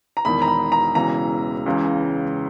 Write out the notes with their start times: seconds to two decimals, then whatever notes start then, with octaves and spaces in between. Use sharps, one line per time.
0.17 A#5
0.25 E1 E2 D#3 B5
0.42 A#5
0.48 B5
0.72 A#5
0.95 E1 E2 C#3 E3 A#5
1.66 C#2 C#3 E3